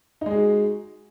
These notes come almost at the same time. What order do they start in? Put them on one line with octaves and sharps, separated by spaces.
D#4 G#3 G#4 F#4